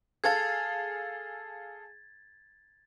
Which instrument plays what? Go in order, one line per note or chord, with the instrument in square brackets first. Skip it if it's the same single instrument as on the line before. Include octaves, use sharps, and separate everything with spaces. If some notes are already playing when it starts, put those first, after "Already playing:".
[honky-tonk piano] G#4 A4 F5 [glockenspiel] G#6 A6